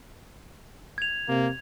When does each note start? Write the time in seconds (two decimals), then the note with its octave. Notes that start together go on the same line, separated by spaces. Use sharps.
0.98 G#6 F7
1.28 C3 A#3